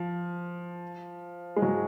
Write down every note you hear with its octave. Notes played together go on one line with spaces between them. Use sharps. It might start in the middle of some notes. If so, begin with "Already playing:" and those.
Already playing: F3
G#3
F#3